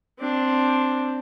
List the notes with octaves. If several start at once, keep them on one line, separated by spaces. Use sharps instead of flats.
C4 D4